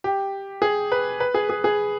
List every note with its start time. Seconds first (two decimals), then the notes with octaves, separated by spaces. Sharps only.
0.04 G4
0.62 G#4
0.92 B4
1.20 B4
1.34 G#4
1.49 G#4
1.64 G#4